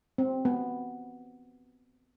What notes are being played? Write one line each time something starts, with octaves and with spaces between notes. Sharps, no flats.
C4
B3